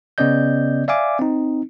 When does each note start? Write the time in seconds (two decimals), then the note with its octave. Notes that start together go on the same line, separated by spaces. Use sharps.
0.18 C#3 B3 C#4 D5 D#5 G6
0.88 D5 E5 F5 G#5 D6
1.19 C4 D#4